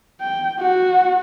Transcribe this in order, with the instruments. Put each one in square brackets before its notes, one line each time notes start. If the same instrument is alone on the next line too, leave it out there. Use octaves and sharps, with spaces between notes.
[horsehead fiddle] G5
F#4